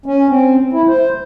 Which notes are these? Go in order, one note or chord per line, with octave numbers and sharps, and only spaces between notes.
C#4
C4
E4
C5